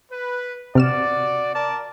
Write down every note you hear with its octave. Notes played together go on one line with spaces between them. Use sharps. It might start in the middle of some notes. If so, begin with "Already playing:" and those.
B4
C3 F#4 D5 F6 E7
A#4 D5 A5